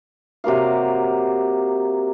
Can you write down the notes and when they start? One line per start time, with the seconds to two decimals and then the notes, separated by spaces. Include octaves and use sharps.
0.44 C3 F#3 A#3 F5